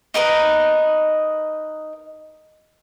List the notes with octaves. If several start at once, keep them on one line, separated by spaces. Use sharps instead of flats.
D#4 A#4 B4 D#5